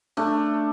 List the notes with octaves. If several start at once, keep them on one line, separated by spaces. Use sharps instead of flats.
A3 D4